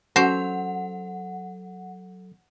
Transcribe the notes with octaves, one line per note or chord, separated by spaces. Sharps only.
F#3 C#4 F#4 A4 C5 F#5 C#6